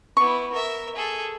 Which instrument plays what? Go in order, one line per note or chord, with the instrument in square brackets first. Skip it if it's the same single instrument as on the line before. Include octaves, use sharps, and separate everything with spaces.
[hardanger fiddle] B3 E4 [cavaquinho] C#6
[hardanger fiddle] A#4 E5
G#4 A4